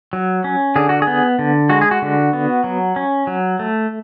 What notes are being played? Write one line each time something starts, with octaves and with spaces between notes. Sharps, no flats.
F#3
C#4
D3 G#4
F#4
G#4
B3
D3
G#3 F#4
G#4
F#4
D3
B3
F#3
C#4
F#3
A3